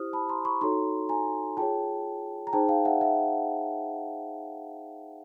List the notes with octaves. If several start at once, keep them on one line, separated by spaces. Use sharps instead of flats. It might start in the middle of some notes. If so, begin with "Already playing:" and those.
Already playing: E4 G4 C5 D#6 F6
A5 B5
A#5 C6
B5 C#6
D#4 F#4 A4 C#5 A#5 C6
G#5 A#5
F4 G#4 C#5 G5 A5
A#5
D#4 G#4 C5 G5 A5
F5 G5
E5 F#5
E5 F#5